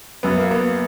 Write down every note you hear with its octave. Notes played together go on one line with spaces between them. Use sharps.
F#2 B3
A#3
A#3 B3